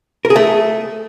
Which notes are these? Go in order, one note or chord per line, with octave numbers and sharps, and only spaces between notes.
A#4
G#4
A3